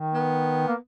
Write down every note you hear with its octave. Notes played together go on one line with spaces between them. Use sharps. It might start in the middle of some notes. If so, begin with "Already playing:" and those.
Already playing: D#3
B3
A#3